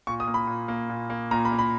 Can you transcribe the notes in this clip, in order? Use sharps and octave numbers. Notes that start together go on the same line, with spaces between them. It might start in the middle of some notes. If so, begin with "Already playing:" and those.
A#2 C#6
D#6
A#3
B5
A#2
A#3
A#2
A#3
A#2 A#5
B5
A#3
B5